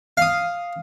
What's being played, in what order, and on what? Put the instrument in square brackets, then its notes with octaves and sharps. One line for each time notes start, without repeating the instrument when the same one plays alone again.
[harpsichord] F5 D#6